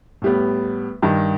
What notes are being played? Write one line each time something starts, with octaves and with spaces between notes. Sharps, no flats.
A2 G3 B3
G2 D#3 G3